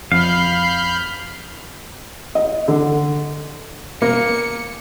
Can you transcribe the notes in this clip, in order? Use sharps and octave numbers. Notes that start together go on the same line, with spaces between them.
F2 F5 B5 F6 G6
D#5
D3
A#3 C#7